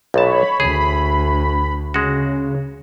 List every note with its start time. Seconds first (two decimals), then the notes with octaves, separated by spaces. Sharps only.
0.14 B1 A#2 C#5 A5 B5
0.60 D2 G#4 B5
1.94 C#3 G#3 F#4